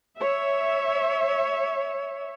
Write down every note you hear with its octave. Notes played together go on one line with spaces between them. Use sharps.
C#5 E5